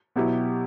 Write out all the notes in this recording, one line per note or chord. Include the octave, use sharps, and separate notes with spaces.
B2 F#3 B3 E4 G4